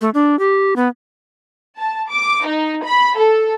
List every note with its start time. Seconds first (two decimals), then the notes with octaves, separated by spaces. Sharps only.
0.01 A3
0.14 D4
0.39 G4
0.76 B3
1.78 A5
2.11 D6
2.45 D#4
2.84 B5
3.17 A4